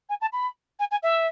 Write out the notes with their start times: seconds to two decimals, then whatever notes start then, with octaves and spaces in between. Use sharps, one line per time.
0.09 G#5
0.21 A5
0.33 B5
0.79 G#5
0.91 G#5
1.03 E5